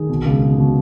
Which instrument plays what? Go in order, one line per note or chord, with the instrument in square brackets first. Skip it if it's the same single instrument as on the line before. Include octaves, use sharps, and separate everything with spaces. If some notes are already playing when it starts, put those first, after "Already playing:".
Already playing: [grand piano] D#3 G#4
B2
C#2
B2
B2